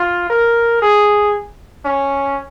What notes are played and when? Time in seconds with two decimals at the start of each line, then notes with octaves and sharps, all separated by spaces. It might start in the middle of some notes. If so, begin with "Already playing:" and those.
Already playing: F4
0.30 A#4
0.82 G#4
1.85 C#4